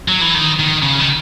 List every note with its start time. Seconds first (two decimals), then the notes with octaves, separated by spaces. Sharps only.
0.08 F#3
0.21 E3
0.34 D#3
0.59 D#3
0.83 C#3
1.00 D#3